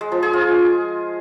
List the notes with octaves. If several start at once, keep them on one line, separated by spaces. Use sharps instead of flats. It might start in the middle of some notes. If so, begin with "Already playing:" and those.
G#3
F3
G#4
F4